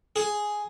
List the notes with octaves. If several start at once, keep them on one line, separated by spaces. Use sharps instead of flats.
G#4